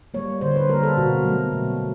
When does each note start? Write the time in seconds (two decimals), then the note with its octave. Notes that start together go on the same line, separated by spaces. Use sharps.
0.14 G3 A#3 C#5
0.41 D3 C5
0.56 B4
0.69 G3 A#3 A#4
0.83 A4
0.97 B2 F#4
1.24 F#3 A3
1.53 B2